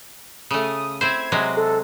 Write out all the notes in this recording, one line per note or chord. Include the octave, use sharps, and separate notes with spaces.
C#3 A3 D#6
C4 E4 C5 G#6
C3 F#3 G#3
A4